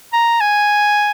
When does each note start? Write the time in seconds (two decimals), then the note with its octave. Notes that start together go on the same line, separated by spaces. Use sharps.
0.13 A#5
0.41 G#5